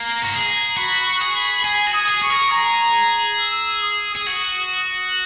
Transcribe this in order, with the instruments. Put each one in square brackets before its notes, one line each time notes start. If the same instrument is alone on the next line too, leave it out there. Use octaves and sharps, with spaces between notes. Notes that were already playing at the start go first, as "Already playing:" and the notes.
Already playing: [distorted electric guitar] A#3 [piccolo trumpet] A#5
[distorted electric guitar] F#4
G#4
[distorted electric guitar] F#4 [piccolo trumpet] B5
[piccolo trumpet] C#6
[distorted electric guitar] G#4
[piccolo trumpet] B5
[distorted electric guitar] G#4 [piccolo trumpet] G#5
[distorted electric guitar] F#4
[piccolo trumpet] D#6
[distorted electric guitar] G#4
[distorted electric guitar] G#4 [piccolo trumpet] C#6
[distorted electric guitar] A#4
[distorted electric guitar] G#4 [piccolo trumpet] A#5
[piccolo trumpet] E6
D#6
[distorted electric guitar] G#4
F#4